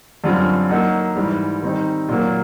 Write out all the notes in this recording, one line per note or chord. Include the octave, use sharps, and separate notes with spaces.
F#2 D3 G3 C4 F4
F#3 A#3 D#4 F#4
G#2 E3 G3
D#3 G3 C4 D#4
A#2 F#3 A#3